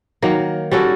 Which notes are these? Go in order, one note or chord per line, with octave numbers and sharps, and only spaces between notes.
D#3 F#3 A#3
G3 C#4 F#4 A4